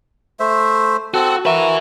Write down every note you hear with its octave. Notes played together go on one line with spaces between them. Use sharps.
A3 C5 E5
C4 F#4 A4
F#4 A#4 B4 E5